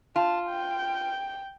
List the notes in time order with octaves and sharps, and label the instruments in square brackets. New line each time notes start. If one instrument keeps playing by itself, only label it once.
[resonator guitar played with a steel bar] F4 [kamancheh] A5
[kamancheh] G5